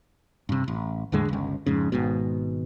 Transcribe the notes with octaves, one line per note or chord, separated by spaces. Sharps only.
G2 C3
A1
E2 A2 D3 G#3
G1 C#2
F2 G#2 C#3
G#1 G#2 B2